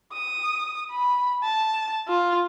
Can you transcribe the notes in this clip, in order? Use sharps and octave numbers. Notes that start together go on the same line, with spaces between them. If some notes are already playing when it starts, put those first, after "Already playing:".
D#6
B5
A5
F4